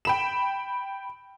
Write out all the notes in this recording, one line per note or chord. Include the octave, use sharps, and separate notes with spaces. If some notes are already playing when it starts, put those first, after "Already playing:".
G5 B5 E7